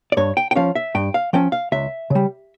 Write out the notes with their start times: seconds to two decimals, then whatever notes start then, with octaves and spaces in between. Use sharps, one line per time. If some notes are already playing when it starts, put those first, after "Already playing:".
0.12 D5
0.17 G2 C#5
0.37 G5
0.51 G5
0.55 F3 C#4 F5
0.75 E5
0.95 G2 G5
1.14 F5
1.33 F3 C#4 G5
1.52 F5
1.72 C#2 E5
2.10 C#3 G3